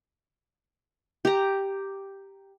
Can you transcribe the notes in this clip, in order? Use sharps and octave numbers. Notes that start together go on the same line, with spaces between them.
G4 A#5